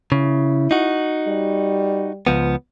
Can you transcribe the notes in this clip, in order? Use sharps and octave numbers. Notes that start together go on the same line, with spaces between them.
C#3 E4
D#4 F#4
G3
C#2 F3 B3